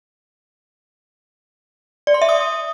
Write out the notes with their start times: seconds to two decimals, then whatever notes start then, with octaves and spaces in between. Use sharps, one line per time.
2.07 D5
2.14 C6
2.22 E5
2.29 D#6